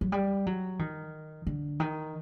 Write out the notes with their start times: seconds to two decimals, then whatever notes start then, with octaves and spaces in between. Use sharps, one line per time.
0.01 F#3
0.12 G3
0.46 F#3
0.79 D#3
1.47 D3
1.80 D#3